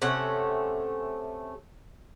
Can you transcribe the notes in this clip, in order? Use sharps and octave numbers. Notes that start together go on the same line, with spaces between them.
C3 A3 C#4 F#5